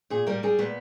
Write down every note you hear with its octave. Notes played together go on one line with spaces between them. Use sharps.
A#2 G#4
G3 A#4
G3 G#4
A#2 B3